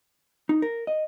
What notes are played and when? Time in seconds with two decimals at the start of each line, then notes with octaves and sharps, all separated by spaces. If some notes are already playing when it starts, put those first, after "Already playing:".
0.49 D#4
0.62 A#4
0.87 D#5